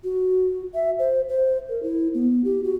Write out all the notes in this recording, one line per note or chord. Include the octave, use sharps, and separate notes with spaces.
F#4
E5
C5
C5
A#4
E4
B3
G4
F#4